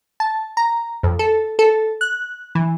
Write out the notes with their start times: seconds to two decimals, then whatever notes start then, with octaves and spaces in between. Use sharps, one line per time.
0.20 A5
0.57 A#5
1.03 F2
1.19 A4
1.59 A4
2.01 F#6
2.55 E3